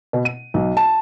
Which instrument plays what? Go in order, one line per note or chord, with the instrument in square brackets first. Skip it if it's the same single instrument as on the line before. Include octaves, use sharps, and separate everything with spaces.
[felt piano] B2
D#7
B1
A5